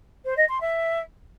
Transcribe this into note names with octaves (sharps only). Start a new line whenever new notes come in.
C5
D#5
C6
E5